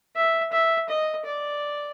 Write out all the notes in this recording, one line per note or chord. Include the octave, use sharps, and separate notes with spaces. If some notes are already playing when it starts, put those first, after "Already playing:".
E5
E5
D#5
D5